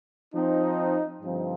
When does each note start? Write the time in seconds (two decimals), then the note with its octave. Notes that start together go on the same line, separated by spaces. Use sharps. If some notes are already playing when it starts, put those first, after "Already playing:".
0.33 F3 C4 D#4
1.21 G2 D3 F3 C4 D#4